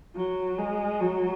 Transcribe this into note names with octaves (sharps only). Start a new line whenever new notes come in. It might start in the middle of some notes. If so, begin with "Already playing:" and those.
F#3
G#3
F#3